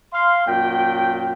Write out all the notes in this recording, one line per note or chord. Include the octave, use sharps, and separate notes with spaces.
F5 C6
F#2 A#2 G5